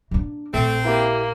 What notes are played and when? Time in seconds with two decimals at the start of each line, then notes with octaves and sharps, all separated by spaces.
0.11 A#3 D4
0.54 A#1 A3 C4
0.85 A#3 E4 G4